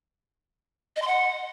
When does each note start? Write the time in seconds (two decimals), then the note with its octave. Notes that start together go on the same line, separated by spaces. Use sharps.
0.96 D#5
1.02 C6
1.07 F#5